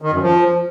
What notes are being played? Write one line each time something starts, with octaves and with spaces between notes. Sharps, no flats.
D#3
F#2
F3